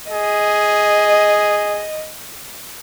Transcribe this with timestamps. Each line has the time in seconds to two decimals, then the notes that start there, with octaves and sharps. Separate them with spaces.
0.11 G#4 D#5